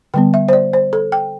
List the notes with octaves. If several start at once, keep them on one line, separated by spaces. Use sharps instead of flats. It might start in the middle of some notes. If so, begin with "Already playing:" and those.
D3 G3 B3 G5
E5
C5
D5
C5
A4
G5